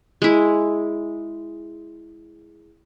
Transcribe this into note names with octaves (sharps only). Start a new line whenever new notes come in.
G#3 E4